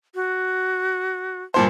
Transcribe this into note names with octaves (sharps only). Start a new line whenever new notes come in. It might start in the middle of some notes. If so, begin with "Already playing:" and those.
F#4
G2 A#2 C5 A5